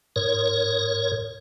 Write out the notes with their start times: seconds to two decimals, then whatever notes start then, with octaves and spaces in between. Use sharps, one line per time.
0.16 G#2 A#4 C#5